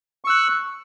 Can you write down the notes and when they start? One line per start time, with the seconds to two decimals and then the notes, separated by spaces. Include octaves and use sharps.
0.25 C#6
0.27 E6
0.30 F#6